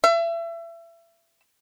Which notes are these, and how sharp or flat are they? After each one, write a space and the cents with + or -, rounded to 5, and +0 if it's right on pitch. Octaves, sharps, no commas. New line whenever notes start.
E5 +30